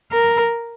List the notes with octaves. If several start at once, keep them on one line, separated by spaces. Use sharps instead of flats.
A#4